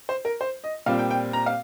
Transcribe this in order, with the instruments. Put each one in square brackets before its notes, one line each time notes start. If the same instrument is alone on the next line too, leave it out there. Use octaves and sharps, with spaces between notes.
[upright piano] C5
A#4
C5
D#5
A#2 G3 C4 F5
G5
G5
A#5
F5